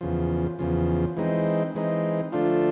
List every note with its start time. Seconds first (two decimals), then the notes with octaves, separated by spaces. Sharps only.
0.01 E2 C#3 F3
0.59 E2 C#3 F3
1.17 E3 G#3 C4 D#4
1.75 E3 G#3 C4 D#4
2.32 D3 F3 A3 D4 F4